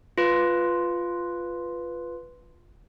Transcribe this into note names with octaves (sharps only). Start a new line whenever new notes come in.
F4 B4